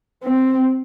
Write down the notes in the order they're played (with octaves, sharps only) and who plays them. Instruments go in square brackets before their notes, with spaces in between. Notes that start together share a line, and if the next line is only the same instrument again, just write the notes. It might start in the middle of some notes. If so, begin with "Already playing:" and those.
[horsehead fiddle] C4